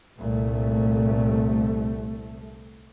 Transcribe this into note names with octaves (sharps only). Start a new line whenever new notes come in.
C2 A#2 A3